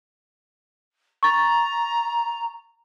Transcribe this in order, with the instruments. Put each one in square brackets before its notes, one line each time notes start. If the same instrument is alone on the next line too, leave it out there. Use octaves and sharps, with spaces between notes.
[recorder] A#5 [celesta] C#6 A6